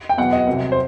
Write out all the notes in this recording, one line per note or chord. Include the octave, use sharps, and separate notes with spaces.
G5
E2 B2 F#3 F#5
D#5
C2 C3 F#3
C5